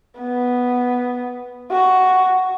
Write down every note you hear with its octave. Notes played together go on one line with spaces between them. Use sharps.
B3
F#4